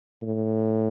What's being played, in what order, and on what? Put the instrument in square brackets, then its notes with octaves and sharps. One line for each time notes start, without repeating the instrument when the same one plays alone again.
[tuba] A2